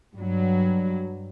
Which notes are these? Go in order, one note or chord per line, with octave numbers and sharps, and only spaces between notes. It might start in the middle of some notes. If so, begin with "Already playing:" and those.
G2 F#3